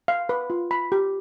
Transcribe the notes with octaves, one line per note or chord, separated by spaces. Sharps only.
F5
B4
F4
B5
G4